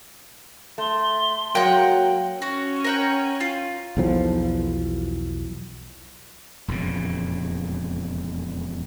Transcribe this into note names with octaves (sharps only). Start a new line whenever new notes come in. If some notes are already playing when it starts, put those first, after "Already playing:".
A3 C6
F#3 G#3 A#3 F#5 G5
C#4 F#4
A#4 F#5 G5
F4
B1 E2 F3
E1 F2 A#2 C#3